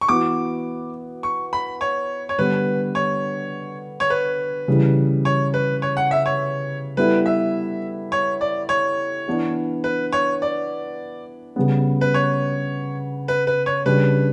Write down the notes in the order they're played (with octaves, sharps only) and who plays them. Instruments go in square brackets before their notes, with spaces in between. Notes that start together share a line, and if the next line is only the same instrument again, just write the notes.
[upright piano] C#6
[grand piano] E3 B3 F#4 [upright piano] D6
[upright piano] C#6
B5
C#5
C#5
[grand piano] D3 G3 B3 [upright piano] B4
[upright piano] C#5
C#5
B4
[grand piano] C#3 E3 G3
[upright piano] C#5
B4
C#5
F#5
E5
C#5
[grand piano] G3 B3 E4 A4 [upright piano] B4
[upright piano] E5
C#5
D5
C#5
[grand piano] E3 B3 D4
[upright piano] B4
C#5
D5
[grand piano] C#3 G3 B3
[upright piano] B4
C#5
B4
B4
C#5
[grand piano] C#3 G3 D4 G4 [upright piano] B4